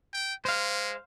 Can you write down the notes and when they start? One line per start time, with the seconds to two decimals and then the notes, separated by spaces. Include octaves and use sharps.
0.13 G5
0.45 G#3 C5 F5